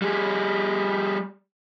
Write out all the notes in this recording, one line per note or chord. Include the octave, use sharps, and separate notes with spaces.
G3 G#4